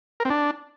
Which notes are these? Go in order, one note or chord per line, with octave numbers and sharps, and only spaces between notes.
A#4
C4
D4